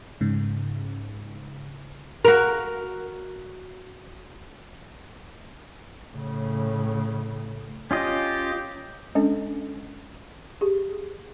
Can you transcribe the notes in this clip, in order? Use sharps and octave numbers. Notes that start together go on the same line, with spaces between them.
G#2 C#3
F#4 A#4
A2 C#3
C#4 F4 G4 D#5
G#3 C#4 D4 A4
G4 G#4